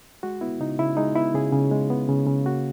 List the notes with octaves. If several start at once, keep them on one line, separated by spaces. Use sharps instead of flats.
G#3 F#4
B3 E4
C#3 D#4
C#3 E4
G#3 D#4
B3 E4
C#3 G#4
C#3
G#3
B3
C#3
C#3
A#3 F#4